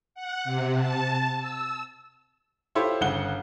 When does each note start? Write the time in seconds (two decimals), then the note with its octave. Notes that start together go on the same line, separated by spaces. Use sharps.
0.15 F#5
0.44 C3
0.78 A5
1.39 E6
2.75 E4 F4 G4 A4 C5 C#5
3.01 G1 C#3 F#5 G7